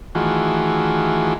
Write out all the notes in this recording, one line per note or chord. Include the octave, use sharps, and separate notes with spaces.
D#3 E3 A3 F4 F#4 G#4